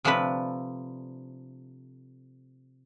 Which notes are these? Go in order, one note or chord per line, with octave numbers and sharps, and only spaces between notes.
C3 F3 A3 D4 B4 B5